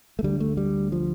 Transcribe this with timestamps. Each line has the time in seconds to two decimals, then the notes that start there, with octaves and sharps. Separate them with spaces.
0.19 A3
0.23 D2 D3 G3
0.40 A3
0.57 G3
0.92 F3